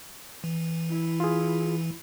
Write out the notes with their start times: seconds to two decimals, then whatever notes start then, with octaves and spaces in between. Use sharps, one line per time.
0.44 E3
0.90 E4
1.20 F4 G#4